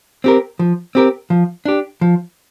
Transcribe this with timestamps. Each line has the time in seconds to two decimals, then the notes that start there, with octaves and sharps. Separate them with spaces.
0.24 C4 G4 A#4
0.59 F3
0.95 C4 G4 A#4
1.30 F3
1.65 D4 G4
2.01 F3